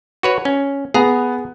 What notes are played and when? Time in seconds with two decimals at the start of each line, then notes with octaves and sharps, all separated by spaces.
0.23 F#4 B4 C#5
0.45 C#4
0.94 B3 G#4 A#5